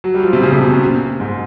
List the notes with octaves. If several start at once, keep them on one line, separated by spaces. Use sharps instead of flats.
F#3
G3
F3
C3
C#3
C3
B2
A#2
G#2